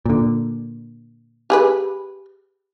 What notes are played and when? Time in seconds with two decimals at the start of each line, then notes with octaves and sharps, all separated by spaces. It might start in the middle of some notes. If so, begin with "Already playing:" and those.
0.06 A#2 D3
1.50 G4 G#4 B4